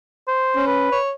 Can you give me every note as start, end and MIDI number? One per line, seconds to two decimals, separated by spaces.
0.28 0.64 72
0.56 0.92 61
0.67 0.98 71
0.92 1.13 73